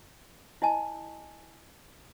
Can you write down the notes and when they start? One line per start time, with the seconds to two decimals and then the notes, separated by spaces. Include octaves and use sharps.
0.62 E4 D#5 G#5 A5